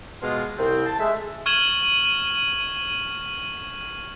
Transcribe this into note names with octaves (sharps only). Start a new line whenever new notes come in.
B2 G#3 F4
C2 C4
A5
G#3 A3 G#4 E5
C#6 F6 G#6 D#7 E7 F#7